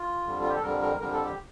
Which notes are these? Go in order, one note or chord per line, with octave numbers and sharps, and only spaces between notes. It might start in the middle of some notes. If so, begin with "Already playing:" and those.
Already playing: F4
F2 D3 G3
F4
G4
A4
F2 D3 G3 A#4
A#4
F2 D3 G3 A#4
A4
G4